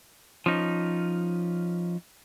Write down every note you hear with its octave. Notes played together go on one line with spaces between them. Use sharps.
F3 C#4 D#4